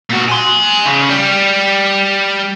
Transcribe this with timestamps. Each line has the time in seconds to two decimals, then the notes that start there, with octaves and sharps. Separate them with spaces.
0.10 A#2 F#4
0.28 G#5 C6
0.86 C#3
1.10 G3